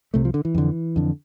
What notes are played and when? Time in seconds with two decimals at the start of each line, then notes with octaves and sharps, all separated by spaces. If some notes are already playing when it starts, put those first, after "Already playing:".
0.14 C2 C3 A3
0.25 F3
0.34 D3
0.45 E3
0.55 F2 D3
0.96 F2 D3